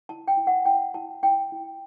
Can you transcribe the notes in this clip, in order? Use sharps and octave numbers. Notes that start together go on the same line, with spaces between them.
E4 A5
G5
E4
F#5
E4 G5
E4 A5
E4 G5
E4